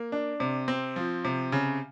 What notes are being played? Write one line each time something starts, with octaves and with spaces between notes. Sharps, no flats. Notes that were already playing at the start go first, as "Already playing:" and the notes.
Already playing: A#3
D4
C3
C4
F3
C3
C#3